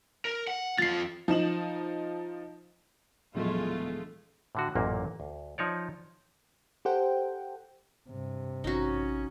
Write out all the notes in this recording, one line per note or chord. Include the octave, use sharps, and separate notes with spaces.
A#4
F#5
F2 F4 A6 C7
F3 D#4 E7 F#7
E1 A#2 F3 F#3 G#3 A3 F4
A2 D3 F#4
A1 F#2 A#2 A#3
D2
F3 D#4 C#5 D5
G4 A4 C5 F#5 G5
G2 C3
A1 C#4 D#4 F#4